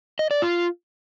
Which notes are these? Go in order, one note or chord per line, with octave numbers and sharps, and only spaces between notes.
D#5
D5
F4